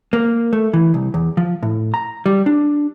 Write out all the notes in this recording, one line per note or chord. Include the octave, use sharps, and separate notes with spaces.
A#3
A3
E3
C2
E2
F3
A2
A#5
G3
D4